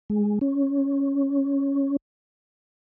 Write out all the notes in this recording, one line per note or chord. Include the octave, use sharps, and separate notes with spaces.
G#3
C#4